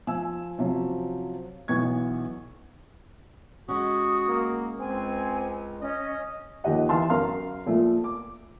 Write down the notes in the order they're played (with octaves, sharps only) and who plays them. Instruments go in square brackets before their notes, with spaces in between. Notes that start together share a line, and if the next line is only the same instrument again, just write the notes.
[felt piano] F3 G#5 E6
C3 F3 F#3 C#4
B1 E3 B3 C#6 G#6
[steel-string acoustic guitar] G#3 C#4 [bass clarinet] F#4 [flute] D#6
[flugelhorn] A#3
[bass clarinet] C#2 [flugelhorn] C4 [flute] G#5
[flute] C#4 [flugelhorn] D#5
[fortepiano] D#2 F3 G4 D#5 F#5
E3 F5 A5 C6
F#2 A#4 F5 C6
A#2 F3 A3
D6